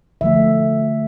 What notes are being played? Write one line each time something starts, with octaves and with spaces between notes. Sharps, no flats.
D3 F3 A3 E5